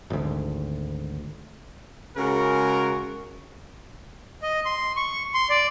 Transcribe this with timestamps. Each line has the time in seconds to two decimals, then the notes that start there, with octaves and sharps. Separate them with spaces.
0.10 G#1 D2
2.17 C#3 G#3 F#4 A#4
4.42 D#5
4.65 C6
4.96 C#6
5.34 C6
5.50 D5